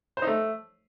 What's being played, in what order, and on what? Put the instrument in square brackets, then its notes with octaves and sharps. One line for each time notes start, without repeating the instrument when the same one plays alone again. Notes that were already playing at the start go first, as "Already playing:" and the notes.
[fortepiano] C5
D#4
A3